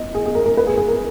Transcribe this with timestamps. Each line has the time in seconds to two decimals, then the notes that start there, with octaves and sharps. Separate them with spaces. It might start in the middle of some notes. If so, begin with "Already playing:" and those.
Already playing: D#5
0.14 G#4
0.25 G#4
0.35 A#4
0.46 A#4
0.57 B4
0.67 G#4
0.77 G#4
0.88 A#4